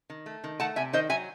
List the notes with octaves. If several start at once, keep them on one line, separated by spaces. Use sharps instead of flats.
D#3
A3
D#3
A3 F#5 A5
C3 E5 G#5
D#3 C5 D#5
F#3 E5 G#5